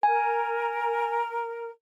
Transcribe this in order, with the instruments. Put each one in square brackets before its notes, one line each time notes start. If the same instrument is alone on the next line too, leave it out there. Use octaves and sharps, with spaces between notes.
[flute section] A#4 [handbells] G#5